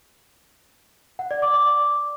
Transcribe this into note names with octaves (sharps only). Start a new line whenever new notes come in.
F#5
D5
D6
D6